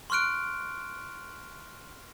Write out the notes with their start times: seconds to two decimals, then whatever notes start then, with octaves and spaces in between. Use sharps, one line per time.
0.10 C6 C#6 F6 F#6 D7